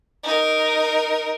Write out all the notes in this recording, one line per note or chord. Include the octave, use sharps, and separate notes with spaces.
D#4 A#4